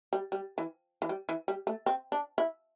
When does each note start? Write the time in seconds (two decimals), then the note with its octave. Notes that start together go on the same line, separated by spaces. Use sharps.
0.13 G3
0.32 G3
0.58 E3
1.02 E3
1.09 G3
1.29 E3
1.48 G3
1.67 A3
1.86 C4
2.12 D4
2.38 E4